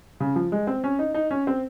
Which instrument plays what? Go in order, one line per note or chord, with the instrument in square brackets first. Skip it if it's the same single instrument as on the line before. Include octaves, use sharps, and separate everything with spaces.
[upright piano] C#3
F3
G#3
C4
C#4
D#4
D#4
C#4
C4